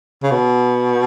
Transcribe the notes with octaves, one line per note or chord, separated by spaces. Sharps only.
C#3
B2